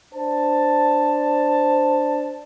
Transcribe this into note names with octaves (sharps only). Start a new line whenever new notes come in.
D4 C5 A5